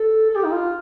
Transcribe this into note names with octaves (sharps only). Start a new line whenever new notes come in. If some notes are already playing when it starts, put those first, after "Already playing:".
Already playing: A4
A4
G4
D#4
F4